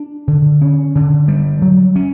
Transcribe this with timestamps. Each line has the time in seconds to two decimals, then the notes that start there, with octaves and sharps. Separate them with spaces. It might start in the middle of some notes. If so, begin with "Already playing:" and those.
Already playing: D4
0.28 D3
0.62 C#4
0.95 D3
1.28 G3
1.62 F#3
1.96 C#4